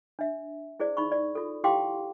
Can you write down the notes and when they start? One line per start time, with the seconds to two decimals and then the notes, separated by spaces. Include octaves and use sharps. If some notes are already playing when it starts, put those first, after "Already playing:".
0.19 D4 E5
0.80 E4 G#4 C5 D5
0.97 D#4 B5 C#6
1.12 D5
1.35 F4 A4
1.64 E4 G4 F5 G5 C6 D6